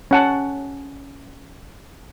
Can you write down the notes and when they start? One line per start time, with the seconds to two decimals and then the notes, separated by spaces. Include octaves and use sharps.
0.11 C#4 F#5 A5